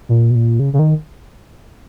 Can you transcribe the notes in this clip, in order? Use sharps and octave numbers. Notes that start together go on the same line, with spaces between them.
A#2
B2
A#2
C#3
C#3
D#3